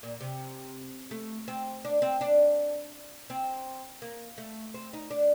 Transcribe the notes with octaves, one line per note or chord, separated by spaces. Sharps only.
A#2
C3
A3
C4
D4
C4
D4
C4
A#3
A3
C4
D#4
D4